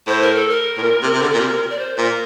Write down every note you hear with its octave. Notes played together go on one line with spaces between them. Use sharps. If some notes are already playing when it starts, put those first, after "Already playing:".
A2 C5
A#4
A4
A#4
A2
A#2
C3
C3
D3
A#2
C3
D5
C5
A#2 A#4